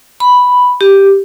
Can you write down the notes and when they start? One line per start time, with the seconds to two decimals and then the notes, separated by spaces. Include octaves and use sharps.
0.20 B5
0.81 G4